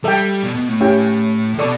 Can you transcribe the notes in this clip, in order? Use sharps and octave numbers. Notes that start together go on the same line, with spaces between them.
G3 A4 E5 G5
B2
B2
A2
C#4 E4 G4 C#5 G5
A2
B2 A4 D5 A5 C#6